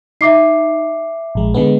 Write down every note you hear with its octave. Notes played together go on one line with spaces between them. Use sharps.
D#4 E5 D6 C7
A#1 G#3
D3 G#3 B3